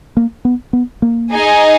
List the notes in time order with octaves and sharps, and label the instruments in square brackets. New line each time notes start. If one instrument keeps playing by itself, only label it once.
[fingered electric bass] A#3
B3
B3
A#3
[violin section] D#4 G#4 D#5 G#5